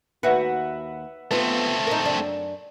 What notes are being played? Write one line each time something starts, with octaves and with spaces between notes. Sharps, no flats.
D#2 F#4 B4 E5 F#5
A3 B3 C4 F4
D#4 A#4
F#2 D4